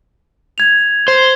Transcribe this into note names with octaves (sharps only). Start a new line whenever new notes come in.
G#6 F7
C5